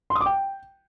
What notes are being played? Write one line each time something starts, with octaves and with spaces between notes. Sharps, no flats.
C6
D#6
D6
G5